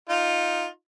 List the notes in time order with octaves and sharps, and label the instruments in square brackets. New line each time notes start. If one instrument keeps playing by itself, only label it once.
[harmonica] D#4 F4